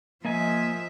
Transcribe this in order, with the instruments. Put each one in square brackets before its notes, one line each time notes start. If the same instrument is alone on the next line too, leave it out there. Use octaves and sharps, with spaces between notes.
[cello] F3 E5 [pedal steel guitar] A#3 D#5 G#5